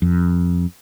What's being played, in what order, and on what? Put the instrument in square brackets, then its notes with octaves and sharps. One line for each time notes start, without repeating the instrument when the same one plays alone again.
[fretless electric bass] F2